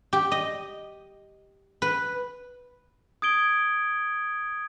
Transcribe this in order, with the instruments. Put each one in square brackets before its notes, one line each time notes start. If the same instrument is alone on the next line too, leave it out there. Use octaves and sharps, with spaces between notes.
[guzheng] G4
D#5
B4
[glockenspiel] D#6 G#6 D7 G7